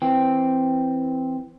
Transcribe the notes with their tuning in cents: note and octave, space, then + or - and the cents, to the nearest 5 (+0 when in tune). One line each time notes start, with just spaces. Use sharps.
E3 +0 C4 +0 G5 +0